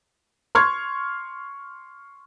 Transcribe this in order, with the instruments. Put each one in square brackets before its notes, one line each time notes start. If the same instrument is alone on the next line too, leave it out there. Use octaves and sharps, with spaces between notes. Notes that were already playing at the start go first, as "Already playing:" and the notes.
[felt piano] C6 C#6 F6 G#6